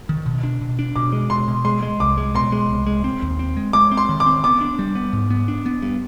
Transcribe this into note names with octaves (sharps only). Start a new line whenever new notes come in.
D#3
B2
D4
B2
D4
B2 D6
G#3
B2 C6
B2
G#3 C6
G#3
C2 D6
G#3
B2 C6
G#3
C2
G#3
C4
D#2
C4
G#3
G#3 D6
C4
C6
D#3
D6
C4
B3 D6
D4
G3
B3
G#2
B3
D4
B3
G2